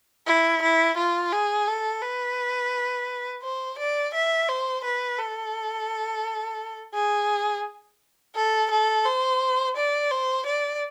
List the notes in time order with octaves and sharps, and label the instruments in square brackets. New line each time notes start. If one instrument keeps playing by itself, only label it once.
[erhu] E4
E4
F4
G#4
A4
B4
C5
D5
E5
C5
B4
A4
G#4
A4
A4
C5
D5
C5
D5